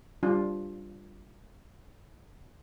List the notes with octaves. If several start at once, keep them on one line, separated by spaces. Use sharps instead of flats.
G3 D4 F4